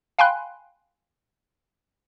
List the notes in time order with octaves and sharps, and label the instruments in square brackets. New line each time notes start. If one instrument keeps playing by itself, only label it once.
[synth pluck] F5 G5 G#5 B5 C6 F#6